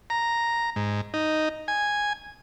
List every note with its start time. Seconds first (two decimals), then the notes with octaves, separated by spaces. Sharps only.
0.10 A#5
0.76 G#2
1.14 D#4
1.68 G#5